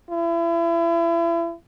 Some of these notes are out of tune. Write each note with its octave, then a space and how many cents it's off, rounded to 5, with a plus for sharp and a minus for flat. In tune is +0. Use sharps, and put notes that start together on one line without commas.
E4 +35